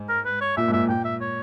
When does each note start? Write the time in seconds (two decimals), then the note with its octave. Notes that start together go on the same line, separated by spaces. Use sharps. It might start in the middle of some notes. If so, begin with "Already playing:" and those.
Already playing: G#2
0.09 A#4
0.25 B4
0.41 C#5
0.57 A#2 E5
0.68 G#2
0.73 A#2 E5
0.88 A#2 G5
1.05 E5
1.21 C#5